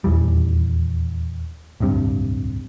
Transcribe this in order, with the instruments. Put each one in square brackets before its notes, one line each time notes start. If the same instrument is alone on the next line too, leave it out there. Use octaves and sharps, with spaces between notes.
[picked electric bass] D#1 E2 E3 G3
D1 C2 G2 C3